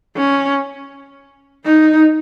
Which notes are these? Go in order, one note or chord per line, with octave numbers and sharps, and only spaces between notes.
C#4
D#4